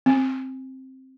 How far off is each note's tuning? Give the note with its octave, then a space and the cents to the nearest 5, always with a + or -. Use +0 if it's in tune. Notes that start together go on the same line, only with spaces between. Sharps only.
C4 +10